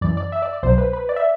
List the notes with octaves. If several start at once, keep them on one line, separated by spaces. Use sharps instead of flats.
F#2 E3 D5
D5
E5
D5
D5
C2 B2 F#3 C5
B4
B4
D5
E5